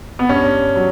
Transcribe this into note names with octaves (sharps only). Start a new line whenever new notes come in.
B3
G2 C#4
F#3